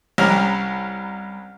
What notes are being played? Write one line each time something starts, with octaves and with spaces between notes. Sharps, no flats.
C2 G3 C#4 A#5 F6